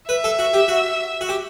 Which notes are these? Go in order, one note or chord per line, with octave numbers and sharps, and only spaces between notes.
B4 E5
A4
F#4
G4
F#4
F#4
G4